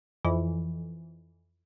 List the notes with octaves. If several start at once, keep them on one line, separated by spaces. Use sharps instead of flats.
F2 E3